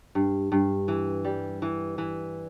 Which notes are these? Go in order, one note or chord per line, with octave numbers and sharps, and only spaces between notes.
G2
G2
E3
G3
E3
E3